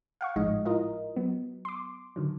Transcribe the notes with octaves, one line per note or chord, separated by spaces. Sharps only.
F5 F#5 C#6
G#1 A2 F3 G#3 D#4 D#5
E4 F4 A#4 D#5
F#3 B3
C6 D6
D3 D#3 F#3